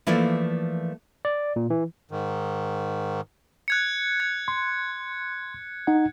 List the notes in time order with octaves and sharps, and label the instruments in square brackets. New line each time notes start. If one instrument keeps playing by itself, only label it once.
[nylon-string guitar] E3 F3 A3 A#3 E4 D5
[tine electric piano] D5
A#2
E3
[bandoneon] G#2 D#3
[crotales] F#6 G#6 C#7
G#6
[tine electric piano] C6
D#4 F#5